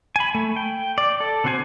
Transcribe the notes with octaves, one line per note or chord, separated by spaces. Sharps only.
G#5 B5
A3
G5
D5
A4
D3 C4 F#4 C5 G#5